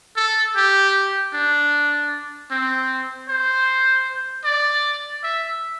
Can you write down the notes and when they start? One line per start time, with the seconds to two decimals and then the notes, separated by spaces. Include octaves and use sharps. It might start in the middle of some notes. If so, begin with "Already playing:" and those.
0.16 A4
0.56 G4
1.34 D4
2.51 C4
3.29 C5
4.45 D5
5.23 E5